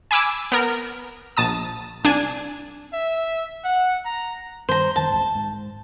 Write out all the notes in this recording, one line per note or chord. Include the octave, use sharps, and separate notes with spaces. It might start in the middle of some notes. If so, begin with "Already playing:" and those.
G#5 B5 D6 E6
B3 A#4
A#1 A5 D#6
C2 D4 G#5
E5
F#5
A#5
G2 D#3 C5 A#5
F2 D#3 A5
C2 G#2
G#2